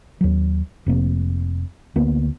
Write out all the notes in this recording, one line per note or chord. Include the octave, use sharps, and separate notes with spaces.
D#2 F#3
F1 C3 A#3
D2 A#3 B3